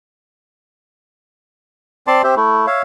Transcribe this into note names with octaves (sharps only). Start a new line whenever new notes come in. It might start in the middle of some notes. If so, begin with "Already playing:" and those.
C4 D5 A5 C6
C4 G4 C5 E5
A3 E4
C#5 E5 F5